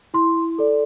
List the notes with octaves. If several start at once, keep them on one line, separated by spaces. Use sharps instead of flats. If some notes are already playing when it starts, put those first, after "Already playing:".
E4 C6
A4 D5